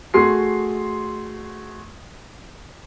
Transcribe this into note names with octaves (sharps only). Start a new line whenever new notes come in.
A3 F#4 G#4 C6 C7